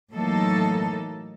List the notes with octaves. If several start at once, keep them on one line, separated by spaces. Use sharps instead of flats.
A2 E3 F#3 A#3 D#4 A4